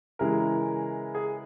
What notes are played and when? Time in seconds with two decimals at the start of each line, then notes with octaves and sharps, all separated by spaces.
0.19 C#3 E3 G#3 E4 A#4
1.15 G#4